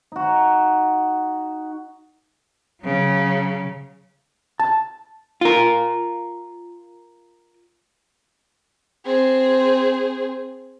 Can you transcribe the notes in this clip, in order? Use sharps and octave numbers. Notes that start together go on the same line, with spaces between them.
D#4 F#4
C#3 F#3
A5
F4 A#4
C4 G#4